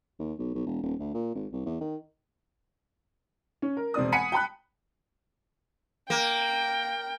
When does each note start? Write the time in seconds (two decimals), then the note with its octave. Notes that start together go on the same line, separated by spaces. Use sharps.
0.19 D#2
0.39 B1
0.54 B1
0.66 E1
0.82 D#1
0.99 D2
1.14 A#2
1.35 G#1
1.52 C2
1.66 E2
1.81 D#3
3.62 C#4
3.77 A#4
3.94 E1 C4 D5 D#6
4.12 F#5 G#5 B5 B6 C#7 D#7
4.32 G5 A5 B5 F#6
6.10 A#3 G5